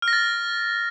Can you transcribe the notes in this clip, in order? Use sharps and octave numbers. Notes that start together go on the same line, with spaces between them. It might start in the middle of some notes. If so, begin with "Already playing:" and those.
F6
A#6
A6